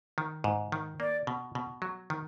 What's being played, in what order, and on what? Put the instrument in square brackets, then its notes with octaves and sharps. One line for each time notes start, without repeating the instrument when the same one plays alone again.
[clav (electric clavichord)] D#3
G#2
D#3
[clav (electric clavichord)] A#3 [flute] D5
[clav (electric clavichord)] B2
B2
F#3
D#3